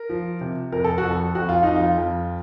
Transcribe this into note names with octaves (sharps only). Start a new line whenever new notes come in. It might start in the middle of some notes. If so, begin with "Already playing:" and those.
Already playing: A#4
F3
C3
F2 A#4
A4
F#4
F2
A4
F2 F#4
F4
F2 D#4
F4
F2